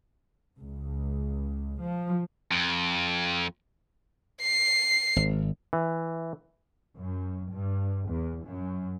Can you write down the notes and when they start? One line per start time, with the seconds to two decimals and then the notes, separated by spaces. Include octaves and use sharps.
0.58 C#2
1.81 F3
2.52 F2
4.42 C7
5.16 G#1
5.73 E3
6.97 F#2
7.52 G2
8.09 E2
8.46 F#2